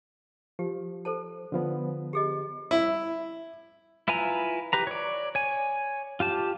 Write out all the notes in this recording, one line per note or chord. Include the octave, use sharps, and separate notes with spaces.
F3 G4
A4 C5 A5
D3 F3 B3
G4 G#4 D#5
E4
E4 F4 B4 G#5 A#5
G4 B4 A#5
C#5 D5
C#5 G#5
F4 G4 A5